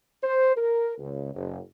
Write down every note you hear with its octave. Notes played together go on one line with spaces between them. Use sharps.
C5
A#4
C#2
F#1